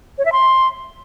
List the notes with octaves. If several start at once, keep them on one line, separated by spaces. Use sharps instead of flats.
C#5
E5
C6